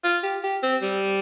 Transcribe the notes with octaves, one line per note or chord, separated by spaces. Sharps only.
F4
G4
G4
C4
G3